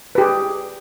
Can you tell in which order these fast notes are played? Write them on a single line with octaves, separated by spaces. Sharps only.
B4 G4 G#4